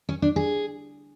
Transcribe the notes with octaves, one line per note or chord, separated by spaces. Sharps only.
C#4
D4
G#4